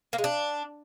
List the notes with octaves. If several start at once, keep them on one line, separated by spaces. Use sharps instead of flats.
A#3
G#3
D4